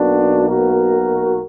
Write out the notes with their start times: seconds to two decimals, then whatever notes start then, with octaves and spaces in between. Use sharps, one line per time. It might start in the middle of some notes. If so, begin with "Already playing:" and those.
Already playing: B1 B2 A#3 D4 F#4
0.48 F#4 A#4